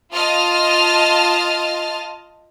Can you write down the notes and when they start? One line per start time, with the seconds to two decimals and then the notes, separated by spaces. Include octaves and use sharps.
0.13 F4 D#5 A5 F6